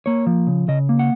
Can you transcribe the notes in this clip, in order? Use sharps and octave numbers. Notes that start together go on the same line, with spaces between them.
A#3 C#5
F3
C#3
C#3 D#5
A#3
F#5